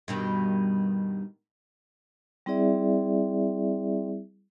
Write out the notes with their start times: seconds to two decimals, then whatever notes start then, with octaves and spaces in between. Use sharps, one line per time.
0.08 G2 B2 D#3
2.46 G3 C4 E4 G#4 D5 E5